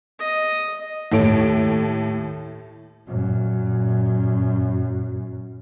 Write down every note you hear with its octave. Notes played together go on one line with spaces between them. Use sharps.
D#5
D#2 A2 A4 C#5 D7
F#2 A#2